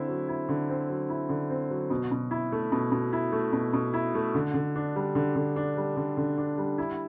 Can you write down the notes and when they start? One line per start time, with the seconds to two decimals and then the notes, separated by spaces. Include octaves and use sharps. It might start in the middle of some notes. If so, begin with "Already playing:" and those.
Already playing: D3 C4 E4
0.08 F#3
0.29 E4
0.49 D3
0.69 C4
0.89 F#3
1.09 E4
1.29 D3
1.50 C4
1.71 F#3
1.90 B2
2.11 B2
2.31 E4
2.52 A3
2.72 B2
2.92 B2
3.13 E4
3.32 A3
3.53 B2
3.73 B2
3.94 E4
4.15 A3
4.34 D3
4.54 D3
4.75 D4
4.96 G3
5.15 D3
5.36 D3
5.56 D4
5.77 G3
5.96 D3
6.17 D3
6.38 D4
6.58 G3
6.78 E4